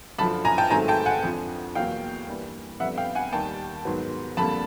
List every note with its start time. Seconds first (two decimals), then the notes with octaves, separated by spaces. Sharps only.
0.18 F#2 D3 F3 A5 B5
0.45 G#5 A#5
0.58 G5 A5
0.70 G#2 D#3 F#3 A3 C4 G#5 A#5
0.88 G5 A5
1.06 F#5 G#5
1.23 F2 D3 F3
1.75 E2 B2 F#3 A#3 F5 G5
2.28 G2 E3 G3 A#3
2.80 F2 D3 G3 B3 E5 F#5
2.98 F5 G5
3.15 F#5 G#5
3.32 D#2 D#3 G3 A#3 G5 A5
3.85 G#2 D#3 F#3 B3
4.37 F2 D3 G3 A#3 A5 B5